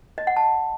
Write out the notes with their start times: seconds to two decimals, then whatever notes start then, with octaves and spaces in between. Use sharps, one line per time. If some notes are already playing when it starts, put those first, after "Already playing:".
0.18 D#5
0.27 F#5
0.37 A5